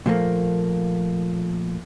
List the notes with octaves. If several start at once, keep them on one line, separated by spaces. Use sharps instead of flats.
A#2 F3 A3 A#3